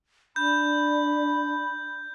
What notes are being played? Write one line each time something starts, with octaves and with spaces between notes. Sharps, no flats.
D4 B5 G6